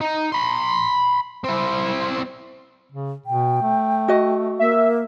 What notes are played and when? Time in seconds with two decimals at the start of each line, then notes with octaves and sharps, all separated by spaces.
0.01 D#4
0.32 B5 C6
1.44 C4 E4
2.92 C#3
3.26 B2 G5
3.62 A3
4.08 F#4 D#5
4.59 A#3 E5